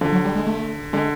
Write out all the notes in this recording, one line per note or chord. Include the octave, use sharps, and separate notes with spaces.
D3 F3
F#3
G3
G#3
A3
D3 G#3